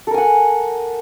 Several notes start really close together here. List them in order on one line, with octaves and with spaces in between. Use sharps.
A4 A#4 G#5 F#5